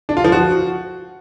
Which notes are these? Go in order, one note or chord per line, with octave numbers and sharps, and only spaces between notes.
D4
F4
F3
F#4